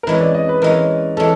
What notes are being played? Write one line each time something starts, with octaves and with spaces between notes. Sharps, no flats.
A#4
E3 G#3 C#4 B4
D5
D#5
B4
E3 G#3 C#4 A#4
E3 G#3 C#4 A4